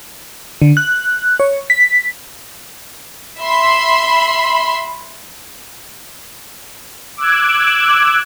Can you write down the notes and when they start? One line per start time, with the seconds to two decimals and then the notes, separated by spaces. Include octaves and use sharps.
0.62 D3
0.77 F#6
1.40 C#5
1.70 B6
3.40 E5 B5 C6
7.17 D6 E6 F#6 G#6